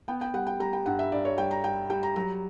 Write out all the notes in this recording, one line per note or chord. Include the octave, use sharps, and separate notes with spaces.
B3 G5
G5
G3 F#5
G5
G3 A#5
G5
G2 F#5
E5
G2 D5
C#5
G3 G5
A#5
G3 G5
G3 G5
A#5
F#3 A#5